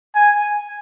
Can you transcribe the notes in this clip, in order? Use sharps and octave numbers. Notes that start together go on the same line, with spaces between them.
G#5